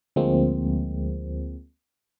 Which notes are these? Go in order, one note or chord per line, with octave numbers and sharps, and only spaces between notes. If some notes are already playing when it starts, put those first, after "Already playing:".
D2 F3 G#3 A#3 C4